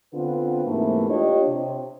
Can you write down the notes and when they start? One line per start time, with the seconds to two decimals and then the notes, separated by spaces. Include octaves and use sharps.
0.14 D3 B3 C4 F4 B4
0.66 G#2 C3 E3 A3 A#3
1.09 D4 F4 G4 C#5 D#5
1.48 C3